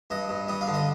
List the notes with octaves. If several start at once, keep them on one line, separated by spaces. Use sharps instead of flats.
G2 D#5
G2
G3 D#5
F5
D3
D#5